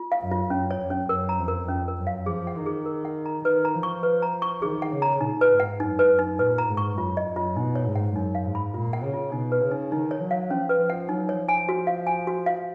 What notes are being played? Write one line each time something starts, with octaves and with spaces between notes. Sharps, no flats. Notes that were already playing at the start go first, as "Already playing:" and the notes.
Already playing: F4
F5
F#2
F4
F#2 C#4
C#5
F#2
C#4
F#2 A#4
A#5
F2
A#4
C#4
A#4
F#2
F5
F3 G#4
F#5
D#3
G#4
A#4
F#5
A#5
D#3 B4
A#5
F3
C#6
B4
A#5
C#6
D#3 G#4
F#5
C#3
A#5
A#2 D#4
B4
G#2
F#5
F#2 D#4
B4
F#2
D#4
A#2 B4
A#5
G#2
C#6
F#2 F4
D#5
F#2
F4
B2 D#4
C#5
G#2
F#5
F#2 D#4
F5
G#2
B5
A#2 F4
F#5
C#3
F4
B2 D#4
B4
C#3
D#4
D#3 D#4
C#5
F#3
F5
F3 C#4
B4
F3
F#5
F#3 D#4
C#5
F3
G#5
F#4
F5
G#5
F#4
F5